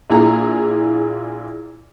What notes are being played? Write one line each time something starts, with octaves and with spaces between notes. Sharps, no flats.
A#1 A#2 E4 F4 G#4 A#5